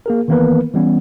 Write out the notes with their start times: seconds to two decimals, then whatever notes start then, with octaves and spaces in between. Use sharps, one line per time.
0.06 A#3 G#4 A#4
0.28 D#3 E3 A#3 B3 A#4 B4
0.74 E3 G3 B3 C#4